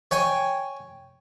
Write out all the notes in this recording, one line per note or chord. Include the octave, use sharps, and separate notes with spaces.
C#5 G5 G#5